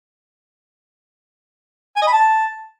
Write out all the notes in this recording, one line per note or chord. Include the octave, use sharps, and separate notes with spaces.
G#5
D#5
B5
A5